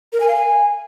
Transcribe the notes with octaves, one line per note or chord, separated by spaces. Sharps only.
A#4
G#5
F5
G#5